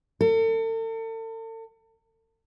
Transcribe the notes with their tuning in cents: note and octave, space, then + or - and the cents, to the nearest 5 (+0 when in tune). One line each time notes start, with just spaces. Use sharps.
A4 +40